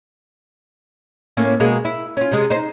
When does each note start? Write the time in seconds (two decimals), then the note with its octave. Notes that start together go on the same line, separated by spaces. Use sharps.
1.37 A2 A#3 C#4
1.60 B2 G#3 A#3
1.85 E4
2.17 C#4 F4
2.31 C3 G#3
2.50 D#4 C5